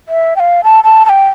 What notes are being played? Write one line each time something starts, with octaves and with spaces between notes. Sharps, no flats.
E5
G5
F5
A5
A5
A5
G5